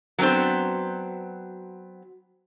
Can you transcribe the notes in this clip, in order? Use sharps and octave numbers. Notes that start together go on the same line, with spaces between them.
F#3 B3 C4 D4 C5